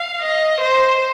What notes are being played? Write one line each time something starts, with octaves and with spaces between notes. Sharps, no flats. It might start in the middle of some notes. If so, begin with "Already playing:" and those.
Already playing: F5
D#5
C5